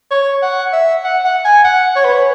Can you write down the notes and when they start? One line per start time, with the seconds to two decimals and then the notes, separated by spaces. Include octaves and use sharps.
0.11 C#5
0.42 F#5
0.73 E5
1.04 F#5
1.24 F#5
1.45 G#5
1.64 F#5
1.96 C#5
2.04 B4
2.13 C#5